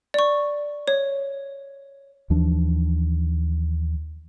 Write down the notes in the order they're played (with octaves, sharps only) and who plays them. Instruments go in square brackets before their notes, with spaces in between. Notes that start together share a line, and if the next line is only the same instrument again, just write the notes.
[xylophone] D5 C#6
C#5
[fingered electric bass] D#2 E3 F3 D4